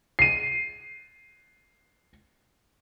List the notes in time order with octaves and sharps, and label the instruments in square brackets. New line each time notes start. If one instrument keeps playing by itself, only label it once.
[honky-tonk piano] C7 D#7